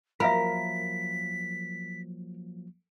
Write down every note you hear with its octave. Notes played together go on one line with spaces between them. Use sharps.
F3 F#3 A#3 A#4 E5 F5 B5 B6